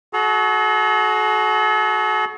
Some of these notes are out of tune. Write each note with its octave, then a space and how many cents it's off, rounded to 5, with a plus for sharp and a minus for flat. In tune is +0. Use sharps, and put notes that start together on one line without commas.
F#4 +0 A4 -45 A#5 +0